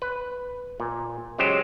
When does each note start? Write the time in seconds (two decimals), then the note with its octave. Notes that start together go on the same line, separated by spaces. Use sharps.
0.02 B4
0.80 A#2
1.38 C#3 F#3 G#3 G4 C5